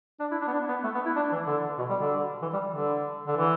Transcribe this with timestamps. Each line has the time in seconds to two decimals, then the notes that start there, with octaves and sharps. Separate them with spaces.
0.20 D4
0.31 E4
0.42 D4
0.47 B3
0.53 D4
0.69 B3
0.83 A3
0.95 B3
1.06 E4
1.16 D4
1.32 E3
1.47 D3
1.78 B2
1.90 G3
2.01 D3
2.42 E3
2.53 G3
2.74 D3
3.27 D3
3.37 E3